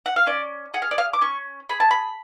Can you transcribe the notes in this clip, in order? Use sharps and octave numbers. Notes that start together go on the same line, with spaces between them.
F#5
F5
C#4 D5
G#4 F#5
F5
D5
F5
D6
C#4 C#6
G#4 B5
A5
B5